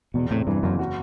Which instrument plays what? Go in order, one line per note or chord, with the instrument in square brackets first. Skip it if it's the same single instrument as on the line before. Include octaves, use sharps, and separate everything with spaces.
[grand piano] E2 [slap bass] B2
[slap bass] A2 [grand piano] C3
[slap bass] G2 [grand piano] E3
[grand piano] F#1 [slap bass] F#2
[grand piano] F#4